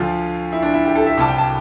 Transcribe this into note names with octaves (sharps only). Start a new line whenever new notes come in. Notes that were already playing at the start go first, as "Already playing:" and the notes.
Already playing: D2 D3 F3 F4
E4
D4
E4
G4
A4
E5
C2 C3 G3 A5
G5
A5